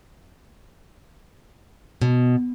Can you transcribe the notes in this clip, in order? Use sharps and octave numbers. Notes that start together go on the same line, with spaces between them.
B2